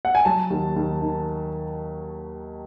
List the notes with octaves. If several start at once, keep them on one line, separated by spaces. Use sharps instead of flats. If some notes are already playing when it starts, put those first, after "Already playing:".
F#5
G#5
F#3 A5
D#2
D#2
D#3